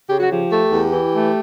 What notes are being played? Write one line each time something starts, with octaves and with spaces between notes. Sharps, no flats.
C#3 G4
F#4
F3 G4
A3
E2
E3
A3